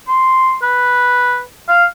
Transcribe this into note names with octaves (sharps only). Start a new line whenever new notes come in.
C6
B4
F5